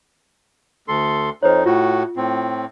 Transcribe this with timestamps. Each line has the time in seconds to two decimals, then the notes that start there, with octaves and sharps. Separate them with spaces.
0.88 D2 A4 C6
1.43 F2 D#4 C5 C#5
1.66 A2 F4 F#4
2.16 A2 C4